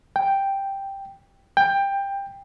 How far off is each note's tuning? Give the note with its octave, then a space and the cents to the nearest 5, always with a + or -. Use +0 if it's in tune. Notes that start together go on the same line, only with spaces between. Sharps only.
G5 +0
G5 +15